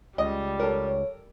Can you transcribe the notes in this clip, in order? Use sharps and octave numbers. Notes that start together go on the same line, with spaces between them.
C#2 G3 D#5
A4 A#4 C#5